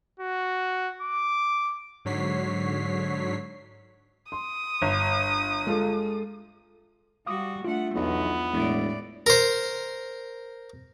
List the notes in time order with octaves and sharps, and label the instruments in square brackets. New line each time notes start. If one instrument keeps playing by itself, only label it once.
[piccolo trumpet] F#4
D6
[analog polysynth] G#2 D3 F#3 C#5 B6 C7
[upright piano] C6 [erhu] D#6
[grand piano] G1
[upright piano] G#3 F4 A4
[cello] G3 F#4 [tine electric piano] F5 D6 D#6
[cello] A3 F#5 [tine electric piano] D4 F4
[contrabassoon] B1 [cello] E2 F3 [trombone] B3
[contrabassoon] E1 [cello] A2 D5
[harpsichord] A#4 C5